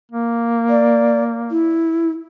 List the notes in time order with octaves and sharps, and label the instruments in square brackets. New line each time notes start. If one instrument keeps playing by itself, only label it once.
[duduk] A#3
[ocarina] D5
E4